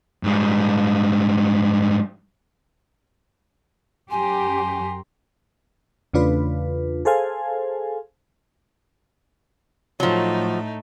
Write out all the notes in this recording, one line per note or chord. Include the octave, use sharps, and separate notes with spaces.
G#2 G3
F#2 G4 G#5 A#5 C6
E2 C#3 A3 D4 F4 B4
G#4 A4 C5 F5 G#5
A2 F3 F#3 A3 D#4